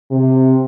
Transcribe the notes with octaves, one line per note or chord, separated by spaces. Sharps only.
C3